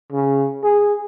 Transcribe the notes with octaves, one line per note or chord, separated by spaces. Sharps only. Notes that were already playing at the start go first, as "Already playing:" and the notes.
C#3
G#4